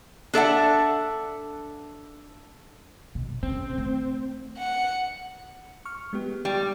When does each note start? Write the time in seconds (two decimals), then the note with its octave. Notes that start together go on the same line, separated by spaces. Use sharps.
0.33 D4 A4 E5 F#5
3.15 B2
3.43 C#3 C4
3.78 A3
4.58 F#5
5.85 C#6 F6
6.13 G#3 B3 G4
6.45 G3